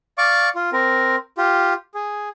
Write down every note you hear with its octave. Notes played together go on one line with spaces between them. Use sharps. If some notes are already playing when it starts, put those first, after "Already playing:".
D5 F5 C#6 D6
F4
C4 A#4
F4 G4
G#4